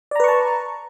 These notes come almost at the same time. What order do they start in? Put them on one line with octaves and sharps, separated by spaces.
D5 A#5 B4 C#6 A5